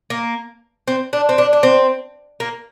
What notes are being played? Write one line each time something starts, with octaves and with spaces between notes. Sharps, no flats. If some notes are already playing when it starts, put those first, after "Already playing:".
A#3
C4
D4
C4
D4
D4
C4
A#3